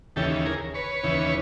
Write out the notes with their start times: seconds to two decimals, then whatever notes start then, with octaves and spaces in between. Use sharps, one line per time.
0.16 D#2 C#3 E3 G4 A4
0.46 G#4 A#4
0.74 B4 C#5
1.03 D#2 C#3 E3